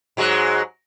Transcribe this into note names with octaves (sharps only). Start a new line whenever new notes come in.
G#2 F#3 G#3